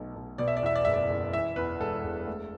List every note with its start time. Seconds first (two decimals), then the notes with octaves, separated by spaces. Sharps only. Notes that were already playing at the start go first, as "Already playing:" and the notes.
Already playing: B1 B2 A3
0.16 B1
0.38 B2 D5
0.48 E5
0.57 D5
0.63 E2 E5
0.76 D5
0.85 F#1 E5
0.94 D5
1.10 F#1
1.33 E3 E5
1.56 E2 B4
1.80 E1 A4
2.04 E1
2.27 A3